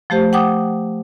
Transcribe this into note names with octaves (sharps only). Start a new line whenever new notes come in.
F3 A3 G4 C5
F#5 G5 D6 D#6